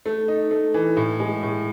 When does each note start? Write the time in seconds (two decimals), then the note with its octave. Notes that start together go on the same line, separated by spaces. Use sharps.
0.06 A3
0.28 D#4
0.51 A3
0.74 E3
0.97 A2
1.20 G#3
1.43 A2